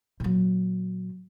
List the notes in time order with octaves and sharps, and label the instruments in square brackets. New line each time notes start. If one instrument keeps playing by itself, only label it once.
[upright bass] A#2 F#3